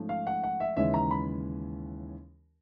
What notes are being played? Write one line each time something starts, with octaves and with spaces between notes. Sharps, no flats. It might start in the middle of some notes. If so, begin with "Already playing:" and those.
Already playing: G#2 F3 A3 C#4
F5
F#5
F#5
E5
D#2 C#3 E3 G#3 C#4 E5
A#5
B5